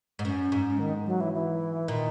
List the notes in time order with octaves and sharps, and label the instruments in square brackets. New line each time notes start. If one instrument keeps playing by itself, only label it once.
[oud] G#2
[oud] F#2 [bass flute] C#4
[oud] G#2
[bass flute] D#3
F#3
E3
E3
[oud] A#2 [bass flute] D#3